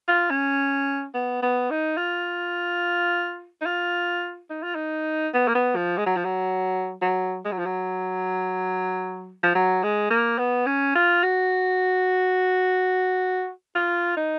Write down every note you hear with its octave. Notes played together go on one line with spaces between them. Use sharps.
F4
C#4
B3
B3
D#4
F4
D#4
F4
D#4
F4
D#4
B3
A#3
B3
F3
G#3
F#3
F3
F#3
F#3
G#3
F#3
F3
F#3
F3
F#3
G#3
A#3
B3
C#4
F4
F#4
F4
D#4